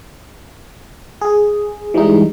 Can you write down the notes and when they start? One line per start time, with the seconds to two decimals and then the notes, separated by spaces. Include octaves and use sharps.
1.21 G#4
1.94 E3 G3 G#3 D#4